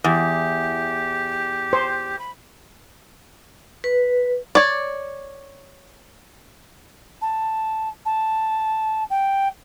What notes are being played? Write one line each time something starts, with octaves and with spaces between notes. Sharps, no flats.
E2 G4
C5
B5
B4
C#5 D5
A5
A5
G5